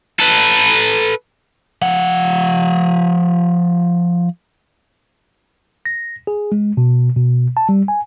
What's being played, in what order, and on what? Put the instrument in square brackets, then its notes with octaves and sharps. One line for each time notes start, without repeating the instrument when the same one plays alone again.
[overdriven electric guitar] A4 B4
F3 F#5
[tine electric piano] A#6
G#4
G#3
B2
B2
A5
G3
G#5